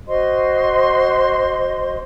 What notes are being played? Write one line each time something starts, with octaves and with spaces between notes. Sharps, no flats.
F#4 C5 D#5 C6